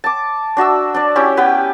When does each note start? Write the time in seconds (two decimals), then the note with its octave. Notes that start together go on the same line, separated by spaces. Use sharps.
0.04 A5 D6
0.57 D4 F#4 E5 E6
0.94 D4 D5
1.16 C#4 E4 G4
1.37 B3 G4 B4 G5